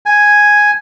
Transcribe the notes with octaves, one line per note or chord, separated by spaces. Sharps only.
G#5